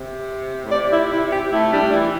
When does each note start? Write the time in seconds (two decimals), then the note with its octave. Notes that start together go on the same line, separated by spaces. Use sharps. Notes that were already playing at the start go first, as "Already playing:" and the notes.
Already playing: C3
0.65 A2
0.71 C3 D5
0.92 E4
1.12 E4
1.32 G4
1.52 A3 E4
1.73 G3 D4
1.92 E3 E4